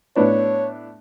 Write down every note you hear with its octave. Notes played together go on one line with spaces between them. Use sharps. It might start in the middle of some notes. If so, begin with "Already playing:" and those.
A2 B3 D4 C#5